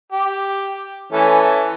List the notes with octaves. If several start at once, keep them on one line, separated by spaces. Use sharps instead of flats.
G4
E3 A3 C#4